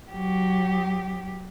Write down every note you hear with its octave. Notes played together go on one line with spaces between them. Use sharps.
F#3 G4